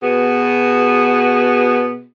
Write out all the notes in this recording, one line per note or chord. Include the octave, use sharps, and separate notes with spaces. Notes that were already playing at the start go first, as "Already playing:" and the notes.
B2 B3 F#4 G#4